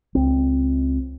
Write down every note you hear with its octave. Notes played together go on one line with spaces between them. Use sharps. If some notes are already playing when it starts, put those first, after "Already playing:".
C#2 C4